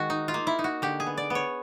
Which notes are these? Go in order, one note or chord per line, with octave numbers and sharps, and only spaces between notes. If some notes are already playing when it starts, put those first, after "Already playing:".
Already playing: D#3 G#3 F#4
D#4
F4
A#3
E4
D#4
F#4
D3 G4
G#4
B3
D5
B3 C#5